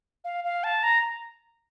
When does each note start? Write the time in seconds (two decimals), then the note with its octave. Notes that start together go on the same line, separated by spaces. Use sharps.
0.24 F5
0.44 F5
0.64 A5
0.83 A#5